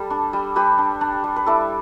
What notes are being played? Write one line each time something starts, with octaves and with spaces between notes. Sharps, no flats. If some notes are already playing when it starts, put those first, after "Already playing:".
Already playing: G3 A4
D4
G3
G3 G4 B4
D4
D4
G3
B4
E4 A4 D5